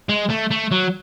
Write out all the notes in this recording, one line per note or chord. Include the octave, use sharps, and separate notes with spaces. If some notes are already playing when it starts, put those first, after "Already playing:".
G#3
A3
A3
F#3